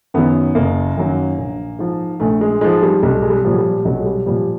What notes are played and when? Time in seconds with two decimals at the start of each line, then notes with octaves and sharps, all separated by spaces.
0.14 F#2 D#3 F#3 B3
0.55 F#1 A#3
0.97 F#2 D#3 F#3
1.38 A#1
1.79 G#2 F3
2.20 A#1 A3
2.41 G#3
2.61 G#2 F3 G#3
2.82 G3
3.03 B1 G3
3.22 G#3
3.30 G3
3.44 A#2 F3
3.53 F#3
3.58 G3
3.85 B1 F#3
4.00 G#3
4.06 G3
4.26 A#2 F3 G3